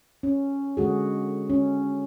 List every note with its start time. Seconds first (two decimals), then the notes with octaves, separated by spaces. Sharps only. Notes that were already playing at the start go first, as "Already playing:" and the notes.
0.23 C#4
0.77 D3 G#3 F#4 G#4
1.50 C#4